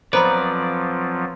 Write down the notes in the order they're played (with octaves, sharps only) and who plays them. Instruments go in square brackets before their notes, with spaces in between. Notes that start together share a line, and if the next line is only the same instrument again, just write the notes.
[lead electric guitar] F2 D5 [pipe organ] F3 F#3 [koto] B3 [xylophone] C5 A#5 B5